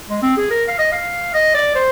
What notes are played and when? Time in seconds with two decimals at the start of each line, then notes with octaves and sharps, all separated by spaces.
0.09 G#3
0.22 C4
0.37 G#4
0.51 A#4
0.68 F5
0.79 D#5
0.92 F5
1.34 D#5
1.54 D5
1.75 C5